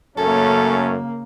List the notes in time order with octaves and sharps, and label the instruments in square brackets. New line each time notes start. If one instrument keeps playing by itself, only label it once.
[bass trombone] F#2 [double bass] C#3 A#3 [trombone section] A3 C#4 [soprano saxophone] A4